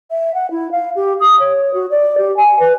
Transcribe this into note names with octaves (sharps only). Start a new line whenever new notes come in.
E5
F#5
E4
F5
G4
D#6
C#5
F#4
D5
G4
G#5
B4